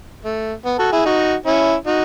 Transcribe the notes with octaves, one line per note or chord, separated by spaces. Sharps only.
A3
B3
F#4 A4
E4 G#4
D#4 F#4
C#4 E4
D#4 F#4